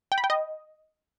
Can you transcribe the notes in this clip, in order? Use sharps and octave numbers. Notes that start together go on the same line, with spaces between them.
G5
B5
G5
D#5